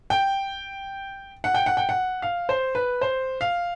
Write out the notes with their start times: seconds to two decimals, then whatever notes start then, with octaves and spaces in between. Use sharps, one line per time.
0.10 G5
1.44 F#5
1.54 G5
1.66 F#5
1.77 G5
1.89 F#5
2.22 F5
2.49 C5
2.75 B4
3.01 C5
3.41 F5